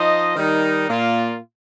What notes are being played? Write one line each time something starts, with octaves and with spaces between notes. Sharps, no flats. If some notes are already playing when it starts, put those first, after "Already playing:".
Already playing: F3 D#4 C5 D#5
D#3 G3 D#4
A#2 A#3 F4